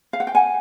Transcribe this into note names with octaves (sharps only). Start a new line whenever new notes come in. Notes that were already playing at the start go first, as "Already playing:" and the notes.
F5
F#5
G5
F#5 G#5